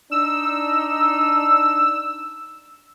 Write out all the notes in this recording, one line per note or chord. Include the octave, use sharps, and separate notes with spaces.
D4 D#4 E6